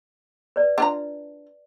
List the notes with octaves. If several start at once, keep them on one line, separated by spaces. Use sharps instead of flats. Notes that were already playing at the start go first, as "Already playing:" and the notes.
B4 D5
D4 F4 A#5